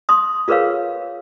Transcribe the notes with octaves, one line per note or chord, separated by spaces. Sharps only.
C6 D#6
F4 G#4 A#4 B4 C#5 F5